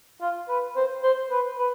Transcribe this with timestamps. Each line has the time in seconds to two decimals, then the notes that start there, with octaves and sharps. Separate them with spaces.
0.21 F4
0.49 B4
0.76 C5
1.03 C5
1.31 B4
1.58 B4